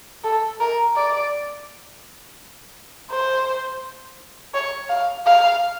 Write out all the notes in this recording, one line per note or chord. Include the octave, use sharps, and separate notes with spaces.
A4
A#4
D5
C5
C#5
F5
F5